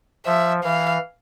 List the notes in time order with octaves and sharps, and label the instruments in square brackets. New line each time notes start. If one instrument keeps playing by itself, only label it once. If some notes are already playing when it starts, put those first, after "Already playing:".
[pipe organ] F3 [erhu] E5
[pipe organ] E3 [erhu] F5